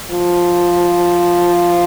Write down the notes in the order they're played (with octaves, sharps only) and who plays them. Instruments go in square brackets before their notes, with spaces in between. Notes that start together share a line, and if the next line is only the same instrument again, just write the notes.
[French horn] F3